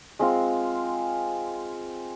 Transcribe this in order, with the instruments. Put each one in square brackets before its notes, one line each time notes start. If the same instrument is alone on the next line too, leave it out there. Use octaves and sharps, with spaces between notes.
[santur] G#3 C4 F4